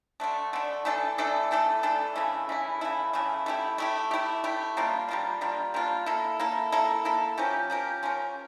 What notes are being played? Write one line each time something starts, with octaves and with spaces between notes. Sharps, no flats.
D3 A3 D4
D3 A3 D4
E3 A3 D4 A4
E3 A3 D4 A4
E3 A3 D4 A4
E3 A3 D4 A4
C#3 E3 A3 E4
C#3 E3 A3 E4
C#3 E3 A3 E4
C#3 E3 A3 E4
A3 E4 G4
A3 E4 G4
A3 E4 G4
A3 E4 G4
G3 A#3 D4 F4
G3 A#3 D4 F4
G3 A#3 D4 F4
G3 A#3 D4 F4
A#3 E4 A4
A#3 E4 A4
A#3 E4 A4
A#3 E4 A4
F3 C#4 G4 A#4
F3 C#4 G4 A#4
F3 C#4 G4 A#4